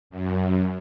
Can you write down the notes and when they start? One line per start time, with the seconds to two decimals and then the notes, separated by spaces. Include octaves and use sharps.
0.10 F#2